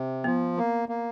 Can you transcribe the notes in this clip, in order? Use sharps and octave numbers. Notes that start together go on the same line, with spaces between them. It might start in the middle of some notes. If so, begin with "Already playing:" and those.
Already playing: C3
F3 B3
A#3
A#3